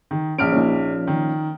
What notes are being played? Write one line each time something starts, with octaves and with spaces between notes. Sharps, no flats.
D#3
A#1 C#4 F6 D7
A#2 F3 C#4 D#4
D#3